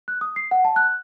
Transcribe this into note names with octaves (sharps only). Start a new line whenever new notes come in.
F#6
D#6
C7
F#5
A5
F#6